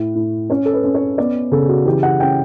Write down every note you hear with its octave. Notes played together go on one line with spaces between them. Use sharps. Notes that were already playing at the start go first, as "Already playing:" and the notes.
Already playing: A2
A2
C#4 C#5
A4
B4
C#4
C#5
B3 D5
C#3 A4
F#4
E3 G4
F#5
C#4 G5